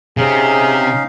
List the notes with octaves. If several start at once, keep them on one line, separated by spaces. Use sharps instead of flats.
C3 C4 C#4 D#4 G#4 F5